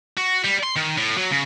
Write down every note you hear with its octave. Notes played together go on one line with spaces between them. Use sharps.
F#4
G3
C6
D#3
A2
F#3
C#3